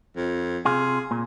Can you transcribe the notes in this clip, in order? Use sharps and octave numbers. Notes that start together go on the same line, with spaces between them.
F2
C3 F4 G#4
A#2